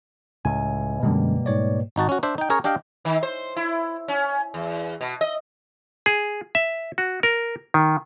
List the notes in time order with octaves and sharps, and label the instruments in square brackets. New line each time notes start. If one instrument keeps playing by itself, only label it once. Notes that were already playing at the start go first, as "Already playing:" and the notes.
[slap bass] C#2 A2 [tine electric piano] G#5
[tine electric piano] F#2 D3 G#3 [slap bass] B2 G3 A#3
[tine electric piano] G#2 C#5 D5
[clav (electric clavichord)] G#1 D#4 F#4 A5
C#4 F#4
D4 C5 E5
D#4 G5
C#4 G#4 A#4 C#5
D4 G4 D#5 F5 G5
[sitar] D#3
C5
E4
C#4
E2
B2
D#5
[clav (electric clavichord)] G#4
E5
F#4
A#4
D#3